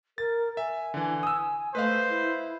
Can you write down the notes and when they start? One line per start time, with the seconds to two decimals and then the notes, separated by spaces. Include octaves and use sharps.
0.18 A#4 A6
0.57 E5 G#5
0.94 D3 E3
1.23 D#6 E6
1.75 A3 B4 C5 D#5 F5
2.10 E4